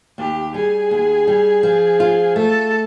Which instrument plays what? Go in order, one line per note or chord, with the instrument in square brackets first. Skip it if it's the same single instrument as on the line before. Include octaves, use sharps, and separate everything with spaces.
[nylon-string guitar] D#2 [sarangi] G4
[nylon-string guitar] G3 [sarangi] G#4
[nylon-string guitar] D#2
G3
F3
F4
[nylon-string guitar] A3 [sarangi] A4